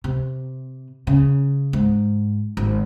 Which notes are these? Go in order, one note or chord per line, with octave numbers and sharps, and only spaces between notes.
C3
C#3
G#2
G#1